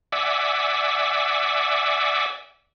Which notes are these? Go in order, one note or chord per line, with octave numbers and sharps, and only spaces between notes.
D5 E5 F#5 G#5 D6 E6